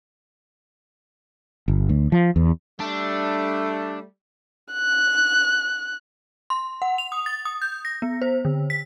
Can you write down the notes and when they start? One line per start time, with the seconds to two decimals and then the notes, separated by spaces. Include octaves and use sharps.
1.68 G1
1.89 D2
2.12 F3
2.36 E2
2.80 G3 A3 D4
4.73 F#6
6.50 C6
6.82 F#5
6.98 F7
7.12 D#6
7.26 A6
7.45 D#6
7.62 G6
7.85 A#6
8.02 B3
8.22 C5
8.45 D3
8.70 B6